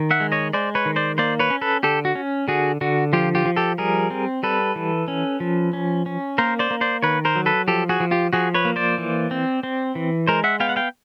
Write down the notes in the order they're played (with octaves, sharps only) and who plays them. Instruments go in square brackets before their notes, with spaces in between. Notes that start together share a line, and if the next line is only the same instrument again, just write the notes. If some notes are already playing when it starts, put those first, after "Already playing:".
Already playing: [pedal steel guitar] D#3
E5 F#5
G#3
C#5 D#5
G#3 C5 D5
B4 C#5
D#3
C5 D5
A#3 C5 D5
B4 C#5
C#4
A4 B4
D3 G4 A4
F#4
C#4
D3 F#4 G#4
D3 F#4
F3 F4 G4
F4 G4
F3
G4 A4
G3 G#4 A#4
C4
G3 A4 B4
E3
C#4
F3
C#4
C#4
A#3 A#4 C5
C5 D5
A#3
C5 D5
D#3 B4 C#5
A#4 C5
F#3
A4 B4
F3 G4 A4
F#4 G#4
F3
F4 G4
F3 F#4 G#4
B4 C#5
A#3
C5 D5
E3
C4
C4
E3
G#3 A#4 C5
E5 F#5
B3 F5 G5
F#5
F5 G5